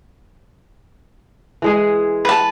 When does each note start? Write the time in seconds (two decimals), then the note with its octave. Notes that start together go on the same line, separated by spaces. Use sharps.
1.62 E3 G#3 G#4
2.25 B4 A5